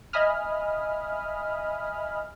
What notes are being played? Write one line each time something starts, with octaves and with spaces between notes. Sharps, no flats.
D#5 E5 G#5 B5 D#6 F6